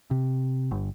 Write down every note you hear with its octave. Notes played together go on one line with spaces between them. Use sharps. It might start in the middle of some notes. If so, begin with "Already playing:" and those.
C3
G1